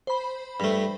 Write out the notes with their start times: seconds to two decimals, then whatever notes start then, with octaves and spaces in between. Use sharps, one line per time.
0.07 C5 B5
0.60 G2 A3